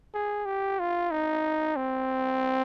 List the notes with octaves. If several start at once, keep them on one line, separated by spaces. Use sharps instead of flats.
G#4
G4
F4
D#4
C4